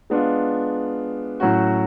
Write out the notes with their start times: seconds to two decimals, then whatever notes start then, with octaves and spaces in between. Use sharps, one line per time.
0.10 G#3 B3 D4 F4
1.40 A2 F#3 C#4 F#4